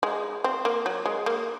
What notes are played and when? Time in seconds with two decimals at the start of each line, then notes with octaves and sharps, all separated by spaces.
0.03 G#3
0.44 C4
0.65 A#3
0.86 F#3
1.06 G#3
1.26 A#3